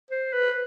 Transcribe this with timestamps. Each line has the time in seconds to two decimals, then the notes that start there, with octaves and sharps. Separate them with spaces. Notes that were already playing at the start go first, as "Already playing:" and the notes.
0.11 C5
0.33 B4